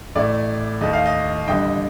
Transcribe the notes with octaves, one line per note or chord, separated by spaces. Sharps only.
A1 A2 A3 D5
D#2 D#3 A3 D#5
F5
D#5
A1 G2 D3 G3 D#5 G5